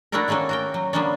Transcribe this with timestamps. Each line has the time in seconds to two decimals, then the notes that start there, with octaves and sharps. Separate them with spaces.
0.12 A3 D4 E4 F#4 A4 A#4
0.28 D#3 A3 A#3 C#4 A4
0.49 F#4 A#4 G5
0.74 F#3
0.93 D3 G3 A#3 B3 C#4 D4